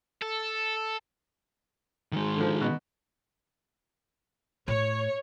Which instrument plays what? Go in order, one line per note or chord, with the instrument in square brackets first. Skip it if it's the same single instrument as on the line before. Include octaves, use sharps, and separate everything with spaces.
[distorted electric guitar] A4
[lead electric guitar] D#3 G#3
[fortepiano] D3 F3
B2
[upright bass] A2 [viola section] C#5